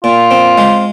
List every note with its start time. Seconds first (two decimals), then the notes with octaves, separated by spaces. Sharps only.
0.04 A#2 F4
0.31 C4
0.58 G#3